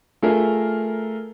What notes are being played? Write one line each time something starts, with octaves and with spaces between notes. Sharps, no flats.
A3 F4 G#4 A#4 E5